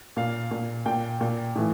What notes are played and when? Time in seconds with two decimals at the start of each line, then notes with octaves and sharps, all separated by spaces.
0.17 A#2 F5
0.51 A#2
0.86 A#2 G5
1.21 A#2
1.55 A2 E3